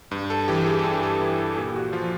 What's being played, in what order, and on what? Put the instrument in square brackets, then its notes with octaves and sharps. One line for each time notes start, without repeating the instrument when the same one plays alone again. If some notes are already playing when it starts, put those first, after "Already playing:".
[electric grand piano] G2
A4
E3 G4
G#4
A4
G2 G#4
A4
E3 E4
A4
A#2 G4
F#4
F3 F4